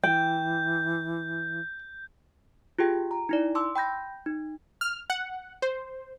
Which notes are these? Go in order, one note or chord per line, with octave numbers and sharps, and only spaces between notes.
E3 G5 G6
F4 G4 G#4 G5
A#5
D#4 E4 D5
A5 C6 D6 E6
G5 B5 G6 A#6
D#4
F6
F#5
C5